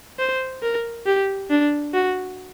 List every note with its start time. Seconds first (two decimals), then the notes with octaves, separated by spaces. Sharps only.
0.19 C5
0.63 A#4
1.06 G4
1.50 D4
1.94 F#4